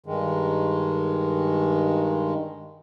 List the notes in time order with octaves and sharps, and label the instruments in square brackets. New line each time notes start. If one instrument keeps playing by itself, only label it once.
[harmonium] G2 D#3 G#3